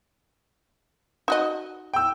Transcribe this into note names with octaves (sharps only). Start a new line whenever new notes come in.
D#4 F#4 D#5
G5 E6